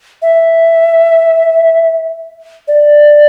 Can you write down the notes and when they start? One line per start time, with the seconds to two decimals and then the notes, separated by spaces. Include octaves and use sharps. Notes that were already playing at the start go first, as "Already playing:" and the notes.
0.22 E5
2.68 D5